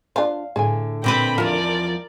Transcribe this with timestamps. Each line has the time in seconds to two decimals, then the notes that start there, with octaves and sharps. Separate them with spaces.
0.16 D4 F4 C5 F5
0.56 A2 D3 G#4 G#5
1.04 A#2 C4 B4 G5 B5
1.38 E2 F3 F4 A#4 D5